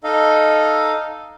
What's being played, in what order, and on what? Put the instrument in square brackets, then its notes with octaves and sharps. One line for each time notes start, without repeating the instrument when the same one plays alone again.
[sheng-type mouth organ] D#4 A4 D#5 F5